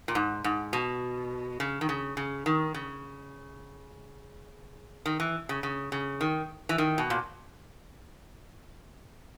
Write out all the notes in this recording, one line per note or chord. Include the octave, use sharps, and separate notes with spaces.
A#2
G#2
G#2
B2
C#3
D#3
C#3
C#3
D#3
C#3
D#3
E3
C#3
C#3
C#3
D#3
E3
D#3
B2
A#2